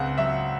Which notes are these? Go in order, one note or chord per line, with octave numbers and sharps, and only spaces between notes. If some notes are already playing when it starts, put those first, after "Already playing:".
Already playing: C#2 C#3 C4 F#5
F#3 E5